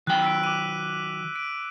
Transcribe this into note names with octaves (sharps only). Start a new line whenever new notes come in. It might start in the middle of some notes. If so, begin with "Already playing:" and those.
D#3 F#3 G5 F#6 F#7
E6 B6 D7
D6 D#7
D7